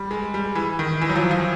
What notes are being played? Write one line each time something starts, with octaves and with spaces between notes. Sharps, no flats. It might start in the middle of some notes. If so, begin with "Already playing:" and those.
Already playing: G3
G#3
G3
E3
D#3
E3
F#3
F3
F3